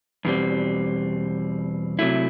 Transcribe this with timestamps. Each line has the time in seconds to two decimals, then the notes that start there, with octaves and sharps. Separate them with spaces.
0.25 E2 B2 G3 C4
1.99 C3 F#3 A3 E4